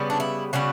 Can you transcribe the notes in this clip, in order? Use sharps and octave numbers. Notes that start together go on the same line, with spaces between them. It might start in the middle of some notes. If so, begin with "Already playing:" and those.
Already playing: C#3 G3 B3
D4
E4
C#3 G3 B3 F#4